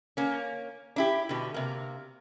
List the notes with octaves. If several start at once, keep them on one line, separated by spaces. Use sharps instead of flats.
A#3 C#4
D4 E4 G4
B2 D3
C3 A#3